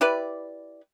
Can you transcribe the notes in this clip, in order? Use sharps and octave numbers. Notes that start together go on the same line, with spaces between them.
E4 G4 B4 D5